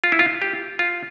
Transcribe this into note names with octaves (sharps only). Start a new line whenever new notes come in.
F4
E4
F4
G4
F4